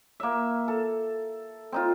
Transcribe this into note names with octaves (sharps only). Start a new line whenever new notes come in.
A#3 E5
A4
C4 D#4 F4